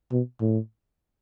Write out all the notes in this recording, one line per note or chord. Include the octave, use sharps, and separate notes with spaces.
B2
A2